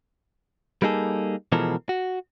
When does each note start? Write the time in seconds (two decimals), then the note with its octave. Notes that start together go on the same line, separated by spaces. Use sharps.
0.82 G3 A#3 D#4 G#4 A4
1.52 B2 E3 F3 G#3 A4 A#4
1.89 F#4